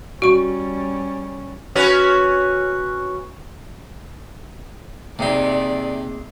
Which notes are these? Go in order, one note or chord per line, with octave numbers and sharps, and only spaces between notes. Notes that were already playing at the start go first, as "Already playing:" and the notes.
G3 C#4 F#4 C#6
C#4 F#4 B4
C3 A#3 D#4 G#4 D5 E5